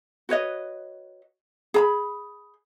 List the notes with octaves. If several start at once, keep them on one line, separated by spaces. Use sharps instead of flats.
F#4 B4 C#5 D#5
G#4 A#5 B5